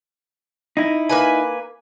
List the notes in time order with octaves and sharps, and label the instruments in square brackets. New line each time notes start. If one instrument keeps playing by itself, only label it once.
[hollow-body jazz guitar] D#4 E4
[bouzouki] A#3 B4 G#5